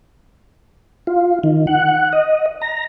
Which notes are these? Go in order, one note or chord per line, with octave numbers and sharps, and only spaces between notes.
F4
D#3
F#5
D#5
A#5